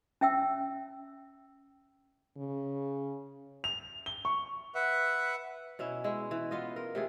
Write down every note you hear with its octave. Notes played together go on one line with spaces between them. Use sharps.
C#4 E5 G5 E6
C#3
F7
G7
C#6
B4 E5 F#5
B2 C#4 E4
G#3 E4
E3
B3 F4 D#5
A#4
C3 A3 G#4